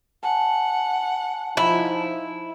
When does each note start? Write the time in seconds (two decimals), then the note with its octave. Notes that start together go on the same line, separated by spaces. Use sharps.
0.23 F#5 G#5 A5
1.57 F3 D#4 E4